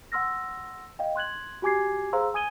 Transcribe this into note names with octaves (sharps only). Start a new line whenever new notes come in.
F#5 C6 E6 F6 A#6
D#5 F5 G5
C6 F#6 G#6 F#7
F#4 G4 G#5 D6 G#6 C7
G#4 C5 F5 A#5 C6 E6
G#5 D#6 G#6 D#7 G7